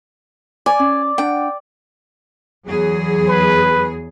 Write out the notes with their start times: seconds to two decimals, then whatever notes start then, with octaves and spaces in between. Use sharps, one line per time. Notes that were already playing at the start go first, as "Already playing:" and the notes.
0.66 D5 G#5
0.79 C#4
1.18 D4 F#5 G5
2.66 E2 F#3 G#4
3.28 B4